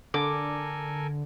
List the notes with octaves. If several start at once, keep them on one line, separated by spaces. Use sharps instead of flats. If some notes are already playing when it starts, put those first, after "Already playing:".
D3 A4 A#4 G#5 D6